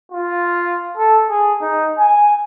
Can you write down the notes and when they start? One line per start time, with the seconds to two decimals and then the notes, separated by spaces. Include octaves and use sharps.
0.12 F4
0.97 A4
1.30 G#4
1.62 D#4
1.98 G#5